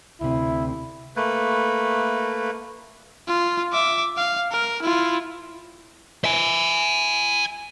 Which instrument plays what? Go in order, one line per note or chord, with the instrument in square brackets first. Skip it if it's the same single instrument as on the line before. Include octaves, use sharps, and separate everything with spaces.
[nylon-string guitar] D2 C3 [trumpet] E4
[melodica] A3 A#3 B4
[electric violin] F4
E5 D6
F5
A#4
E4 F4
[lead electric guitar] E5 G#5